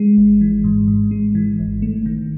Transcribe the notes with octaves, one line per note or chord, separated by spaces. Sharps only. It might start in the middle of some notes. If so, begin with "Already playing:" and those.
Already playing: G#3
G#1
E3
G#2
G#2
G#3
E3
G#1
A3
D#3